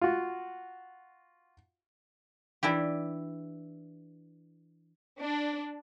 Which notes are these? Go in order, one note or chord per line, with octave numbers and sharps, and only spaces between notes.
F4 F#4
E3 D4 E4 G4
D4